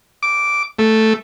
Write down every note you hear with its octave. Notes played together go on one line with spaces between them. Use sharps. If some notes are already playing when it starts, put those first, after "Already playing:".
D6
A3